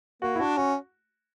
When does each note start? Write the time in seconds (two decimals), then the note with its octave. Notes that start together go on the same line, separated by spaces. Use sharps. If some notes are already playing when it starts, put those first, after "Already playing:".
0.22 A#3 F#4
0.35 E4
0.40 D4 F#4
0.57 C#4 F#4